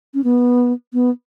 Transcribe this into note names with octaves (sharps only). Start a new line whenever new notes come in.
C#4
B3
B3